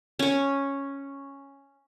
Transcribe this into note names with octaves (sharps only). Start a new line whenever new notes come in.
C#4 C#5